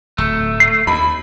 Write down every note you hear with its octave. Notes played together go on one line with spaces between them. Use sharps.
D1 A3
C7
D#2 B5